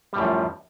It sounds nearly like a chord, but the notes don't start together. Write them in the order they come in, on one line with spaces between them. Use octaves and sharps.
G3 A2 F#2 F3